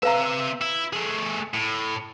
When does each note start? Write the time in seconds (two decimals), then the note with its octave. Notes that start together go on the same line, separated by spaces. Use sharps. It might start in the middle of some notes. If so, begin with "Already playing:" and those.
0.03 C4 B4 E5 F5 A#5
0.61 E4
0.93 A3 G#4
1.54 A2